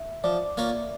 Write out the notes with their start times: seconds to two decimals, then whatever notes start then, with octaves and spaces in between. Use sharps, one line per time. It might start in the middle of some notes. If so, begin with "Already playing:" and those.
Already playing: E5
0.24 F3 D5
0.57 A#3 C#4 F4 C#5